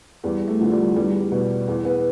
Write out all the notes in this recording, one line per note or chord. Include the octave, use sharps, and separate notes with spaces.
E2 G3
A3
D3 F3
G3
E2 G3
B2
E2
B3